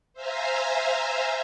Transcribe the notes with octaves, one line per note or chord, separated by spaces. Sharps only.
C5 E5 F5 G#5 A#5